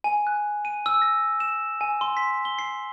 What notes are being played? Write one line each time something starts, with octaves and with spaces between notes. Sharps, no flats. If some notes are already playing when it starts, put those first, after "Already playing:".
G#5
F#6
D#7
E6
A#6
E7
G#5
C6
B6
G7
C7